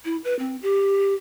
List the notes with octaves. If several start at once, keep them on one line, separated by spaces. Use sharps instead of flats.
E4
B4
C4
G4